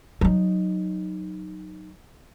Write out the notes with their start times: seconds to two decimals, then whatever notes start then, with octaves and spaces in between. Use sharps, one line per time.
0.21 F#3 D#4